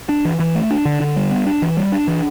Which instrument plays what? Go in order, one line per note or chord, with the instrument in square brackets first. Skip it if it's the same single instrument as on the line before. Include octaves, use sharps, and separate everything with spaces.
[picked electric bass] D4
E3
E3
A3
D4
D3
D3
G3
B3
D4
E3
G3
D4
E3